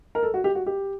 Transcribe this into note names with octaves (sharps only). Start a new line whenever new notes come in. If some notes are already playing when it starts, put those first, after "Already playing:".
A#4
A4
F#4
G4
F#4
G4